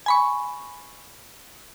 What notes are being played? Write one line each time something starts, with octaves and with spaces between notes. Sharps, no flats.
G#5 B5 C#6